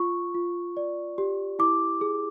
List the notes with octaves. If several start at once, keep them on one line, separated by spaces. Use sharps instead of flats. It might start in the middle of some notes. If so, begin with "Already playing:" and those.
Already playing: F4 C#6
F4
D5
G4
E4 D6
G#4